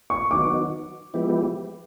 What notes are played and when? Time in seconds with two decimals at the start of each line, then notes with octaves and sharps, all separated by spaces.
0.10 C#6
0.30 D#3 F#3 B3 D#4 F#4 D6
1.14 F3 G#3 B3 E4 G4